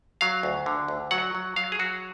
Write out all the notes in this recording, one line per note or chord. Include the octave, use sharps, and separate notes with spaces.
F#3 F5
D2
D3
D2
F#3 F#5
F#3
F#3 F5
G#4
F#3 F#4